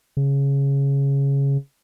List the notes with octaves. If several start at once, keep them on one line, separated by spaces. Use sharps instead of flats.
C#3